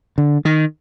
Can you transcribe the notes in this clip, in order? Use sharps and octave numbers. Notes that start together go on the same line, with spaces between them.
D3
D#3